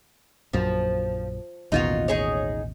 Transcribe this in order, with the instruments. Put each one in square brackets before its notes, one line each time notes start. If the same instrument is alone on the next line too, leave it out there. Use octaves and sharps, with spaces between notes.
[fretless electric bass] A#1 F#2 [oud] F3
[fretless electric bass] A1 D#2 B2 [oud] D#4 F4 F#4
[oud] D#4 G#4 C#5